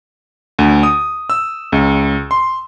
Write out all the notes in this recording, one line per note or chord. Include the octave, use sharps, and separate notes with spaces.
D2
D#6
E6
C#2
C6